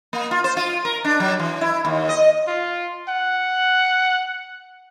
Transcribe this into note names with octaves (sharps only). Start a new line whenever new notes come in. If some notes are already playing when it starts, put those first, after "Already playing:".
A#3
F4
C5
F4
A#4
D4
F#3
E3
E4
D#2
D#5
F4
F#5